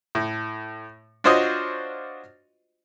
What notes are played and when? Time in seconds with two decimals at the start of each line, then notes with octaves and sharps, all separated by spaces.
0.15 A2
1.24 D4 F4 F#4 C5 C#5 D#5